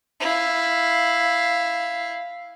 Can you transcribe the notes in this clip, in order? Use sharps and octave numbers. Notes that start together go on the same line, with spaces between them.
E4 F5